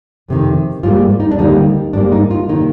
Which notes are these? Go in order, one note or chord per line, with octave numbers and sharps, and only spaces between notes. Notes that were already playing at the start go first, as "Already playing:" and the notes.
F2 C3 D#3
G#2 G3 A#3 F4
D#4
D4
D2 D3 G3 A#3 D#4
G#2 G3 A#3 D4
D#4
F4
C3 D#3 A#3 D#4